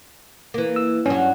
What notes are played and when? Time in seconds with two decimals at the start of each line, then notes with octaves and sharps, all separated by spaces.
0.54 E3 A#3
0.76 E6
1.06 G2 F#3 C#4